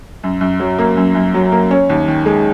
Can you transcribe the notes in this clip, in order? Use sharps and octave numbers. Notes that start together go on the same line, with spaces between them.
F#2
F#2
F#3
A#3
F#2
F#2
F#3
A#3
C#4
D#2
D#3
G#3